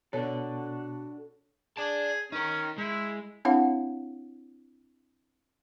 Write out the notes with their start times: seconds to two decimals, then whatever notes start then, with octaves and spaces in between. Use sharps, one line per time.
0.13 B2 D4 F#4 A4 C#5 A5 F#6
1.77 G#4 D5 A5
2.32 C#4 D#4 A#4
2.78 G#3 E4
3.45 C4 D4 E4 C#5 F5 F#5